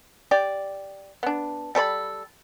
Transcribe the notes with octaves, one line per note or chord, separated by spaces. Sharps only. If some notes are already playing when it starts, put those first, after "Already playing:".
G4 D5
B3 D4
G3 A4 C#5 B5